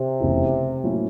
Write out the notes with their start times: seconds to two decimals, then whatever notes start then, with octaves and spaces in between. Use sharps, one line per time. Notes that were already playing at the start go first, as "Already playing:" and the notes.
Already playing: C3
0.20 F1 E2 C#3 E3
0.84 A2 F#3 A#3 C#4 E4